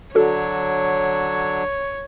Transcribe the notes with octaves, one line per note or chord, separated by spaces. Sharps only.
D3 F#3 D4 F#4 A4 C#5